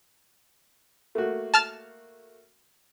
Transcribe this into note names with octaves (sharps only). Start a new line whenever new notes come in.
A3 A#3 F#4
A5 F6 A6